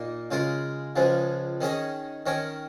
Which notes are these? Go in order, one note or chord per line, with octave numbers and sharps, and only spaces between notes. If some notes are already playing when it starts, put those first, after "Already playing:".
Already playing: A#2 A#3 D#4
C#3 G#3 F4 A#4
C#2 C#3 F3 G#3
D#3 C#4 G#4 D#5
D#3 C#4 A#4 C#5